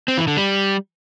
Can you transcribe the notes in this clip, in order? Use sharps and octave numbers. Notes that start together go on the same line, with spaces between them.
C4
E3
D3
G3